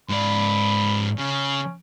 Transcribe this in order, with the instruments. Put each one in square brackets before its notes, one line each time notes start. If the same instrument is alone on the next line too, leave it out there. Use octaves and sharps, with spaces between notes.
[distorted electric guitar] G#2 D5 [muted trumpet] B5
[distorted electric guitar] C#3 [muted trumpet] C#4